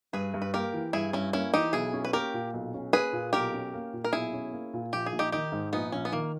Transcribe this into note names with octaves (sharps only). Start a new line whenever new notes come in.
G2 G#4 B4
G2
B4
A#3 G4 A#4
E3
G2 E4 G#4
G2 C#4 E4
A#3 C#4 E4
E3 D#4 G4
B1 E4 G#4
C#4
B4
A#3 G4 A#4
A#2
B1
C#4
A#3 G#4 B4
A#2
B1 G4 A#4
C#4
A#3
A#2
A#4
B1 E4 G#4
C#4
A#3
A#2
A#1 G4
G#4
A#1
D#4 G4
D#3 D#4 G4
G#2
A#1 B3 D#4
A#1 C#4
B3
D#3 A#3